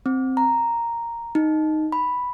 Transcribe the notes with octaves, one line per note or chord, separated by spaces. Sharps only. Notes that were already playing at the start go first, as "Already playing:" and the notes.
C4
A#5
D#4
B5